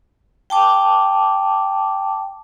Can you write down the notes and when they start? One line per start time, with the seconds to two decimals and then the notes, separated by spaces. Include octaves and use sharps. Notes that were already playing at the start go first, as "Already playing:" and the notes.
0.50 G5 A5 D6